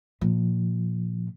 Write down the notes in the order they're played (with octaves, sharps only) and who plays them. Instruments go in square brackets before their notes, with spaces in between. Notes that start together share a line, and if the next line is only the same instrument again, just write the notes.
[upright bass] A#2 [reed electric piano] F3